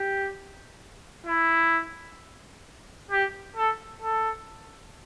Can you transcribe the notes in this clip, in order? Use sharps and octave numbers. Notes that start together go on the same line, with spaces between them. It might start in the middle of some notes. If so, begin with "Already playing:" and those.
Already playing: G4
E4
G4
A4
A4